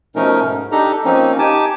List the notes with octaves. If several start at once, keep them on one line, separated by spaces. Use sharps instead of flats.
B2 F3 A3 C#4 D#4 A#4
G#2
D4 D#4 G4 A4 A#5
F3 A#3 C4 C#4 D#4
D#4 G4 G#5 A5 D6